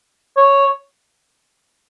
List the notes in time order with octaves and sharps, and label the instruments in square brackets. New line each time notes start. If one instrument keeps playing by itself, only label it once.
[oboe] C#5